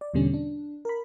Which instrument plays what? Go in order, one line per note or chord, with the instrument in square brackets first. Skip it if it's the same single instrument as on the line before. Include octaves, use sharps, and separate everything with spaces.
[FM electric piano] D5
E2 B2 D3 G3 C#4
D4
A#4 B5